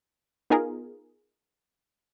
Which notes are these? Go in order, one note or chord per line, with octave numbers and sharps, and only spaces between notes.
B3 D#4 F4 G#4 A#4